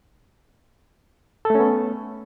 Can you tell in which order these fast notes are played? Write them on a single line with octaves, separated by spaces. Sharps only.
A4 A3 C#4 B3